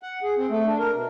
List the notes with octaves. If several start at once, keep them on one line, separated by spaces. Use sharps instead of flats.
F#5
G#4
C4
A3
D4
A#4
B2